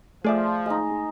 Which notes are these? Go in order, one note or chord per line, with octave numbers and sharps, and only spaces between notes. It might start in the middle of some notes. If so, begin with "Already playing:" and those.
F3 A3 G#4 D5 E5
G#3 D#4